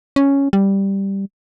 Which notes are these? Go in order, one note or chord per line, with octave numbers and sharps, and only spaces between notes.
C#4
G3